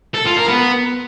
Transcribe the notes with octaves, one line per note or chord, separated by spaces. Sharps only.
A4
F4
A#4
B3